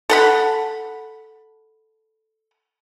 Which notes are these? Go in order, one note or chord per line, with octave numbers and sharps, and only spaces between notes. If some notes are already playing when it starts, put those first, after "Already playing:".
A4 F#5 B5